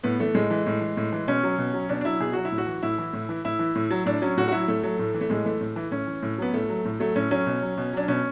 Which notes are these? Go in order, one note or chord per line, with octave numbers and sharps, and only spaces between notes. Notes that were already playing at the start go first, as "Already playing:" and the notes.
A2 B3
E3 A3
A2 G#3
E3
A2
E3
A2
E3
B2 C#4
F#3
B2
F#3
B2 D4
D4
F#3 E4
B2 G#4
F#3 F#4
E4
A2
F#4
E3
A2 E4
E3
A2
E3
A2 E4
E3
A2
F#3
A2 D4
F#3 C#4
A2 F#4
F#4
F#3 E4
A2 A3
F#3
A2
E3
A3
A2 G#3
E3 A3
A2
E3
A2 C#4
E3
A2
F#3 B3
A2 A3
F#3
A2
F#3 A3
A2 C#4
F#3 C#4
B2
F#3
B2
F#3 D4
B2 C#4